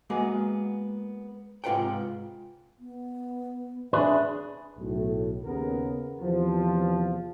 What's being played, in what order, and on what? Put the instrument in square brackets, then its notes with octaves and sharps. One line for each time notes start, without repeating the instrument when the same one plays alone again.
[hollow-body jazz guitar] G#3 A#3 B3 F#4 G#4
G#2 C3 F4 B4 F#5 G5
[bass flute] B3
[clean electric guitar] D4 G#4 B4 [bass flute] E5
[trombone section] B1 A2
D#2 C#3 B3 A#4
E2 C3 F3